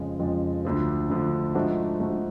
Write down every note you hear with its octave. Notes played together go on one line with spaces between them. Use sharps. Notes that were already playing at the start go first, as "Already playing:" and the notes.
Already playing: F2 C#3 F3 G#3
F2 C#3 F3 G#3
D2 D3 F3
D2 D3 F3
G#2 F3 A3 D4 F#4
G#2 F3 A3 D4 F#4